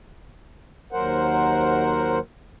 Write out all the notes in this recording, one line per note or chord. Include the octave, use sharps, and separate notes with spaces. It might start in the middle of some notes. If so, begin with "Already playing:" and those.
D#2 F#3 A#4 C5 F#5